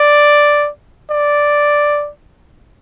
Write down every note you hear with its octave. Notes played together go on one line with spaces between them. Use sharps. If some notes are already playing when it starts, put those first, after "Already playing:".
Already playing: D5
D5